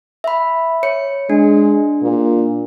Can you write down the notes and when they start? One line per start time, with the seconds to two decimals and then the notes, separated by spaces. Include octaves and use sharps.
0.24 E5 B5
0.83 C#5 C#7
1.30 G#3 D4
2.02 A#2